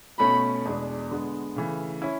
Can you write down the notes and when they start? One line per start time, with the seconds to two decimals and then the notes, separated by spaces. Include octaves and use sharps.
0.19 B2 A3 C#4 B5
0.65 E2 B2 G#3 D4
1.11 D3 G#3 B3
1.56 C#3 E3 A3
2.02 C#4 E4